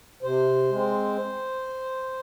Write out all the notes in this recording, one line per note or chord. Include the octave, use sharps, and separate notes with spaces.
C3 C5
G#3 C4